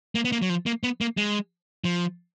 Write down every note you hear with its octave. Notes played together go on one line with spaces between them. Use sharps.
A#3
B3
A#3
F#3
F3
A#3
B3
A#3
G#3
F3